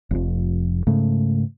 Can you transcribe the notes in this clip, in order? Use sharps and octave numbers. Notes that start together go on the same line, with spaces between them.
F1 F2
G#2 C#3 A3